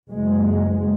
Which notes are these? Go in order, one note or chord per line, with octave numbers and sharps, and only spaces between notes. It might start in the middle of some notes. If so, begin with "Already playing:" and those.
F#1 G#3